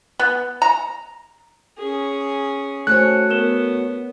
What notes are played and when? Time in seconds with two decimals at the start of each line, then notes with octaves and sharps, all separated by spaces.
0.19 B3
0.62 A#5
1.78 C#4 G#4
2.87 A3 F#4 C5 C#5 G#5 F#6
3.30 B3 A#4 E7 G7